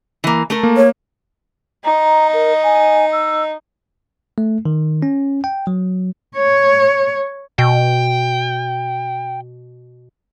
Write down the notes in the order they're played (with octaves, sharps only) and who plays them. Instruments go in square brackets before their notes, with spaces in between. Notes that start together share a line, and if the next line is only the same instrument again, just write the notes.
[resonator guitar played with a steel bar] E3 A#3
A3 A4 A#4
[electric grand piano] A#3
[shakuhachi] C#5
[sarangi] D#4 [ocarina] A#5
[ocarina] A#4
G#5
E6
[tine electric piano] A3
D#3
C#4
G5
F#3
[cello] C#5
[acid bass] B2 [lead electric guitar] G5